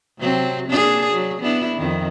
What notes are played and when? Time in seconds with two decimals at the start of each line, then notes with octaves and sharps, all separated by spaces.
0.19 C3 F#3 C4
0.69 A#3 D4 G#4
1.12 F#3
1.42 B3 D4 E4
1.77 F2 D#3